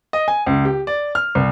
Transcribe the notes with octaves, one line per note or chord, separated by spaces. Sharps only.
D#5
G#5
C#2
G4
D5
F6
C2